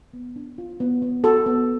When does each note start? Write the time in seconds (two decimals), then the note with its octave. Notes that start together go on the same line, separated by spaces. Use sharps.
0.13 B3
0.36 D4
0.58 F4
0.80 B3
1.02 B3
1.24 F#4 A4
1.46 B3